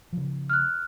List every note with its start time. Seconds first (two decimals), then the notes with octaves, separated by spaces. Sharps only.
0.13 C#3 F3
0.50 F6 F#6